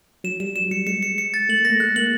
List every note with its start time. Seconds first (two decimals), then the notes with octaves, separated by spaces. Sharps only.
0.24 F#3 E7
0.40 G3 E7
0.56 F#3 E7
0.71 G3 C#7
0.87 G#3 C#7
1.03 C#7
1.18 C#7
1.34 A6
1.49 A3 F#7
1.60 A#3
1.65 A#6
1.70 A3
1.80 G#3 F#6
1.96 A#3 F#7